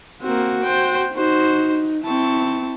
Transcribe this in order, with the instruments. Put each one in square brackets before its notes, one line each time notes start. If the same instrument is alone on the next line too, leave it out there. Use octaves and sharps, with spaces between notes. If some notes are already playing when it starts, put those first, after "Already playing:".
[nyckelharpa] A#3 C4 [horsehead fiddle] F#4
[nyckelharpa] C5 G5
[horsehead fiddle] D#4 [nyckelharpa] F#4 C5
[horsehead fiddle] C4 E4 [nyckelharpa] A5 C#6